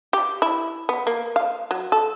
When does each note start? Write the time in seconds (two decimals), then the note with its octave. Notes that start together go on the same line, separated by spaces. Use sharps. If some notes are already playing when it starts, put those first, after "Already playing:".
0.13 G4
0.42 E4
0.89 B3
1.07 A#3
1.36 F5
1.71 F#3
1.92 A4